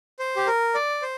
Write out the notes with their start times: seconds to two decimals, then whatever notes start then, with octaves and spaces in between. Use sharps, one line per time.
0.19 C5
0.36 G4
0.47 A#4
0.75 D5
1.02 C5